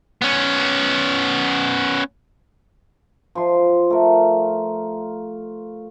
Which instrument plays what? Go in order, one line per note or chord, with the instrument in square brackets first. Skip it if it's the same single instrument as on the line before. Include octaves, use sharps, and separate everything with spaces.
[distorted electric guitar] B3 C#4
[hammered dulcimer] F3 C6
A3 A#4